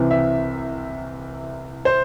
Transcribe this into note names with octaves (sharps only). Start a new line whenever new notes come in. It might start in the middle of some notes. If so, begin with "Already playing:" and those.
Already playing: C2 C3 E3
E5
C5